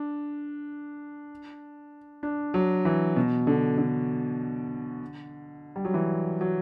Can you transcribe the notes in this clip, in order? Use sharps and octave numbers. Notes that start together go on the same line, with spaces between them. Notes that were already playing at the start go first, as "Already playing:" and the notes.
Already playing: D4
D4
F#3
E3
B2
D3
D3
G3
F#3
E3
F#3